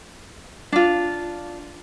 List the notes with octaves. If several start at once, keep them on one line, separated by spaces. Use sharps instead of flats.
D4 F4